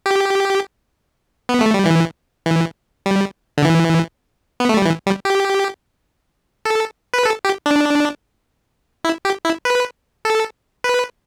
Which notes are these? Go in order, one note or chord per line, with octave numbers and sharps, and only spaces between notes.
G4
B3
A3
G3
E3
E3
G3
D3
E3
B3
A3
G3
E3
G3
G4
A4
B4
A4
G4
D4
E4
G4
E4
B4
A4
B4